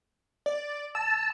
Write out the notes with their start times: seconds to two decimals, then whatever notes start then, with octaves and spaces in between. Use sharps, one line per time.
0.46 D5
0.95 A5 E6